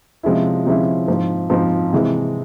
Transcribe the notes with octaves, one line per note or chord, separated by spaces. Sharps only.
C3 F3 G#3 C#4 E4
C3 F3 G#3 C#4 E4
G#2 F3 C4
G#2 F3 C4
C3 E3 G#3 C4 E4